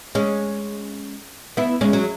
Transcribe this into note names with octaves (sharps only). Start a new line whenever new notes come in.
G#3 C#4
B3 E4
G#3 C#4
F#3